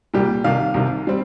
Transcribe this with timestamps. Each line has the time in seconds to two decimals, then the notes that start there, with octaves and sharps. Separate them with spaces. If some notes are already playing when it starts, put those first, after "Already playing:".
0.14 C2 A#2 G3 G4
0.44 C2 C3 D#3 F5
0.74 C2 C3 D#3
1.07 G3 C4